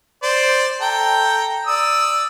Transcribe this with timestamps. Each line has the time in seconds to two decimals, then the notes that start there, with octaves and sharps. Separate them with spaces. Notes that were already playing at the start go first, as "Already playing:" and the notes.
0.23 C5 D5
0.81 A4 G5 A#5
1.67 D5 D#6 E6